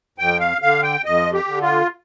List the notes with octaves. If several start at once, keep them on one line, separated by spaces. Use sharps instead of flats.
F2 G5
F5
D3 F5
G5
F2 D#5
G4
D3
F4